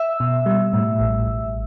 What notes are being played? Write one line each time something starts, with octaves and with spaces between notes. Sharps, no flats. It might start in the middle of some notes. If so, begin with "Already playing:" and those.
Already playing: E5 E6
B2
G3
A2
A1
A1